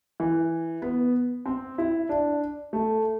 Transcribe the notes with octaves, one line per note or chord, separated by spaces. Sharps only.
E3
B3
C4
E4
D4
A3